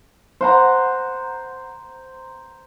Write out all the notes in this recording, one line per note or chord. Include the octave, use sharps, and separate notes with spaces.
C5 F#5 A#5